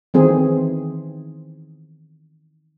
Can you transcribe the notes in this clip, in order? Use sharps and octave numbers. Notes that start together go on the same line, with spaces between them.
D#3 E3 C4 G#4